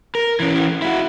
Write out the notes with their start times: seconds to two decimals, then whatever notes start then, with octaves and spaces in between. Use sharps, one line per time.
0.15 A#4
0.40 E3 C#4
0.82 E4 F#4